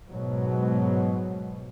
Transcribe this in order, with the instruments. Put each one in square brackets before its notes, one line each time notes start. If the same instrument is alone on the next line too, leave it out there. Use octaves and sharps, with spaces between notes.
[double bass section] G#2 B2 F#3